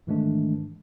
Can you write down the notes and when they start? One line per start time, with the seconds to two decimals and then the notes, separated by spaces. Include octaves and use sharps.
0.07 G#2 D#3 E3 G#3 A3 D4